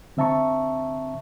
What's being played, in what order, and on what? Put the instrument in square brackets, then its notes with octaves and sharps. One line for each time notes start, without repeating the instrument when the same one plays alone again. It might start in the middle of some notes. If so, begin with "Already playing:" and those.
[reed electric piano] D3 C4 E5 A5 A#5 C#6